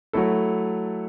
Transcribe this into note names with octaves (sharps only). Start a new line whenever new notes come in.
F#3 A3 E4 A4